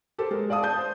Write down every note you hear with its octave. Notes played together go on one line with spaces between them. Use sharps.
G4 A4 A#4 C5
G#3 A#4
D5 F5 A5 D#6
A5 D#6 G6
C5